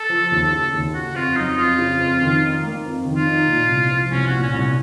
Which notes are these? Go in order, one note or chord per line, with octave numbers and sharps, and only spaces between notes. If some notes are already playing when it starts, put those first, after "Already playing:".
Already playing: A4
F3
D#2
C#3
D#2
C#3 F#4
F2 F4
F#3 D#4
F2 F4
C#3
F2
D#3
D#4
A#3
F2
D#3
F4
D#4
A#2
C2
F3
C2 C#4
F#4
A#2
C#4
C2
C#4